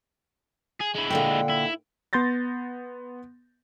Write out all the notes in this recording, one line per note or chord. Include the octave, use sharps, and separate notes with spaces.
G#4
G#3 E4
A#2 D3 G5
E4
B3 C6 G6 A6 A#6